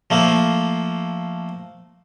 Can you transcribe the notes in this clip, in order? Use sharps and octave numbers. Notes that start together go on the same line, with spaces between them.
F3 A3 A#3